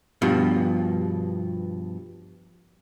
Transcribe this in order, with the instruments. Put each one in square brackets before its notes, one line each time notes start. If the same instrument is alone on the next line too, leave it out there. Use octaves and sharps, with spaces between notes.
[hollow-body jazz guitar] G2 B2 F3